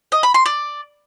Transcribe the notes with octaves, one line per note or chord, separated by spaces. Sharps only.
D#5
B5
C6
D5